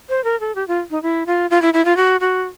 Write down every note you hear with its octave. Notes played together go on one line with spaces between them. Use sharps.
C5
A#4
A4
G4
F4
D#4
E4
F4
F4
E4
E4
F4
F#4
F#4